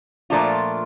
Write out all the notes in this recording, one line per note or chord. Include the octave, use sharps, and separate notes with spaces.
A#2 F3 A3 D4 F4